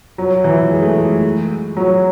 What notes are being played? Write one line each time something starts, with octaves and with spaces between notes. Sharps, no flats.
F#3
E3
G#3
A3
G#3
F#3